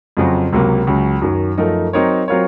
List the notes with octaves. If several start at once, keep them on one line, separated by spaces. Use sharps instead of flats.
F2 C#3 F#3 C4 F#4
C#2 C3 F#3 A#3
C#2 C#3 F#3
F#2 D#3 F#3
F#2 F3 A3 D#4 A#4
F#3 C4 D#4 A#4 C#5
F#3 C4 F4 A#4 C#5